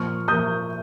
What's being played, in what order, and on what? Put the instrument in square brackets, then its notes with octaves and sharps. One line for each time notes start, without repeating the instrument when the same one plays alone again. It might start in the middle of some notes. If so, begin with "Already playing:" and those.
Already playing: [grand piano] A#2 F3 A#3 C#6 F6
A#2 F3 A#3 D#6 G6